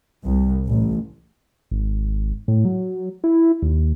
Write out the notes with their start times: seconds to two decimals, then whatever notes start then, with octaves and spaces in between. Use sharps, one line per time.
0.25 C2
0.66 A1
1.71 G#1
2.48 A2
2.65 F#3
3.24 E4
3.62 D#2